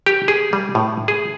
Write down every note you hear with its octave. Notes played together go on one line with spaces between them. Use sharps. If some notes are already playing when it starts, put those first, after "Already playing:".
G4
G#4
G3
A2
G#4